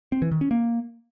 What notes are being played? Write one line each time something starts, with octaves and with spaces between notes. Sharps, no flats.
C4
E3
D#3
C#4
A#3